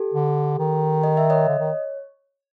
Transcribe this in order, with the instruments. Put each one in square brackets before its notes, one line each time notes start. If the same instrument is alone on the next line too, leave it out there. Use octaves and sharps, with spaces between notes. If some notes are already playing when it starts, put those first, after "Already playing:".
Already playing: [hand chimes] G4 A4
[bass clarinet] D3
D#3
[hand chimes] D#5
E5
C#5 D#5
[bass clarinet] D3
D#3